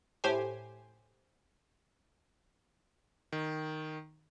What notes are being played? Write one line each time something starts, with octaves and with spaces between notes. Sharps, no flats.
A2 G4 C5 G#5
D#3